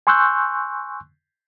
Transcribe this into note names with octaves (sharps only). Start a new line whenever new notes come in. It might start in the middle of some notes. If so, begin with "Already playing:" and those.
G#5 C6 C#6 E6 F#6 G6